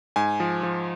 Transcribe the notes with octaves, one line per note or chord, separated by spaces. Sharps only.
G#2 G#5
F3
F3